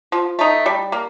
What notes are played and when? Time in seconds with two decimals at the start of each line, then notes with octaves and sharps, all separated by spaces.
0.12 F3
0.39 A3 D#4
0.66 G3
0.92 A#3